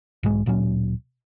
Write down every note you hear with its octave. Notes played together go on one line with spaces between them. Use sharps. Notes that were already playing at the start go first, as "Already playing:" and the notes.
B1 G#2 G#3
D1 A#2 F#3 C#4